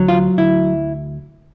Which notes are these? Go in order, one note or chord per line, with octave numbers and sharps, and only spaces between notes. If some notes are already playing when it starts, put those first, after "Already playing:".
Already playing: D2 F#3
F4
D2 E4